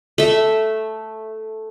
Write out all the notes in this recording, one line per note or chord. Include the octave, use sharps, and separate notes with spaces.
A3 E5